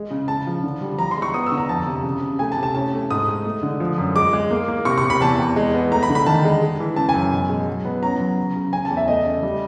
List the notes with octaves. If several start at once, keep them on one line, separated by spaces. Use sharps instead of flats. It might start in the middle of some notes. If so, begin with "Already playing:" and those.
Already playing: G#3
C#3
C#3 A5
F3
D3
G3
F3 A#5
C6
G#3
C#6
B3 D#6
E6
D3
A#5
F2 A5
C3
C#3
C#3
A3 G#5
A5
C3
A5
C#4 A5
A3
G#2 D#6
G#3
A3
D3
F3
F#2
G#3 D6
G#3
A#3
A#3
C3 C#6
C#6
C3
B5
E2 A5
E2
G#3
B3
A3 A#5
B5
D3
B5
D#3 A5
G#3
G#3
E3
C#3 A5
G#5
F#2
B2
G#3
F#3
B3
C#4 A#5
F#3
C#3
C#3
C#3 G#5
A5
E2
E5
A3 D#5
C#3
G3